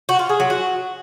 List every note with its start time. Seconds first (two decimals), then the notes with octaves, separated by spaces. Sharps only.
0.09 F#4
0.19 F4
0.29 G#4
0.40 F#3
0.50 F#4